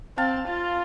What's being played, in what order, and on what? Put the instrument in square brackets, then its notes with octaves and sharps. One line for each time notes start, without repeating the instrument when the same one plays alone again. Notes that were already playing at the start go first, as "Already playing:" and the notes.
[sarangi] C4 [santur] F5 A5
[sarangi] F4